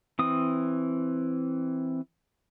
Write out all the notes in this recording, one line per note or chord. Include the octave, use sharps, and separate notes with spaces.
E3 C4 D#6